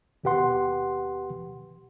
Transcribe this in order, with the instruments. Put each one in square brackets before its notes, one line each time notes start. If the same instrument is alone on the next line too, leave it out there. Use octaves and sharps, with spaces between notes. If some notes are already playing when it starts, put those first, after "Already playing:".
[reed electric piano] D#2 B2 G4 B4 F#5 C6